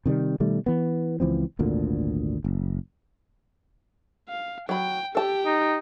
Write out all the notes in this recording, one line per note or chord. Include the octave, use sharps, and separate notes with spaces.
C3 D#3 F#3 G3
B2 D#3 G3 A3
E3 B3
C#2 E3 F3 C4
G#1 D2 A#2 D3
F#1
F5
F#3 G5 B5
G4 A4 G5 A5
D#4